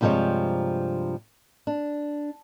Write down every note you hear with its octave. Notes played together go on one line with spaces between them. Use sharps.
G2 C3 F3 G#3 C#5 D5
D4